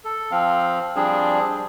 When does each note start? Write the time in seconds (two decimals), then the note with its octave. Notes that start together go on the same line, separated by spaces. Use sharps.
0.04 A4
0.31 F3 C4 F5
0.96 F3 G3 C4 D4 G#4